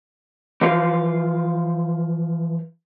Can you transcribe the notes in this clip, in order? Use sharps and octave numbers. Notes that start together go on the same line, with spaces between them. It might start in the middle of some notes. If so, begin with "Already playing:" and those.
E3 F3 F5